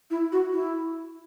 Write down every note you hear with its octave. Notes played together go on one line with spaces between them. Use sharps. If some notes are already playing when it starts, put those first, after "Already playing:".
E4
F#4
E4